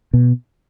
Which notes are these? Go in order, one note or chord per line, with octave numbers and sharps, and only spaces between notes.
B2